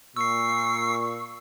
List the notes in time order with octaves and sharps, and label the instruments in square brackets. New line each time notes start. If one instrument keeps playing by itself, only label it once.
[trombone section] A#2 [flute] C#6 [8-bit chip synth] E6 C7